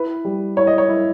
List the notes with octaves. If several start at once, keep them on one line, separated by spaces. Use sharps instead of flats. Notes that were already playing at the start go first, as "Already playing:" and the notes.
Already playing: E4 B4
G3
E4 C#5
D#5
C#5
E4